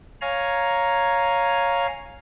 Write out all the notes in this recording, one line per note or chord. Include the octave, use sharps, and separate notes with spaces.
C#5 F5 G#5 A#5